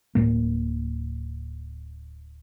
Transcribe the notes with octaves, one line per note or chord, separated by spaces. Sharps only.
D1 E2 A2 A#3